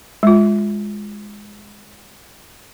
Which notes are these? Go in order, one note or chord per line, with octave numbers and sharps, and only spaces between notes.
G#3 F4